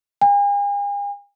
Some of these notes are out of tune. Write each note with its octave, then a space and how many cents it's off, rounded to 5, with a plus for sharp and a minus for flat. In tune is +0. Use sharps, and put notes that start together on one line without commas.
G#5 -45